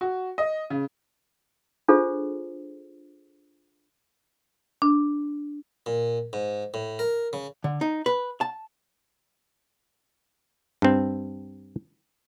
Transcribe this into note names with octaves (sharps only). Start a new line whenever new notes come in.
F#4
D#5
C#3
D4 F4 G#4 A4 C5
D4
A#2
G#2
A2
A#4
C#3
D3
D#4
B4
A5
G2 C4